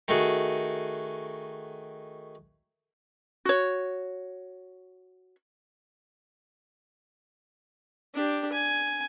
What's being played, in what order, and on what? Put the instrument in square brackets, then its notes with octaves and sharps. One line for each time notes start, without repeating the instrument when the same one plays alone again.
[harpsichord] D#3 A3 F#4 G#4
[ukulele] F#4 C#5
[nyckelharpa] D4 G4
G#5